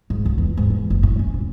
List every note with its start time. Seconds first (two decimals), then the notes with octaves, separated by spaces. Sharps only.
0.10 G#2
0.25 C#2
0.38 E2
0.57 G#2
0.70 E3
0.90 F#1
1.03 A2
1.19 C#4
1.34 F1